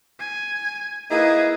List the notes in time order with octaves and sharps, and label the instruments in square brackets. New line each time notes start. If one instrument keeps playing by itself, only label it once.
[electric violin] G#5
[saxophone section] A#3 D#4 E4 [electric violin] G#4 B4